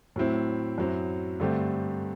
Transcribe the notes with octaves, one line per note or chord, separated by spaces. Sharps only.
A2 F#3 C4 E4
F#2 F#3 C4 E4
G2 D3 A3 C4 G4